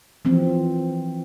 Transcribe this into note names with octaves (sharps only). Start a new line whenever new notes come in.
E3 F3 C4